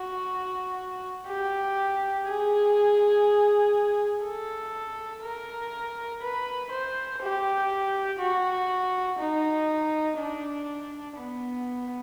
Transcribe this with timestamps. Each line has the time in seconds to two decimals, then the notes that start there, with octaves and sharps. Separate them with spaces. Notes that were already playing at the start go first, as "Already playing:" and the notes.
Already playing: F#4
1.27 G4
2.26 G#4
4.24 A4
5.23 A#4
6.22 B4
6.71 C5
7.21 G4
8.20 F#4
9.19 D#4
10.18 D4
11.17 B3